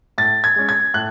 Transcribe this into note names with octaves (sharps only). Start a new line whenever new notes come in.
A2 A6
G#6
G#3 C#4
G#6
A2 F#6